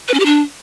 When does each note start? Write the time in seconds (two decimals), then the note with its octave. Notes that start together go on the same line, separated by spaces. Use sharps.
0.08 B4
0.14 C#4
0.20 G4
0.26 D4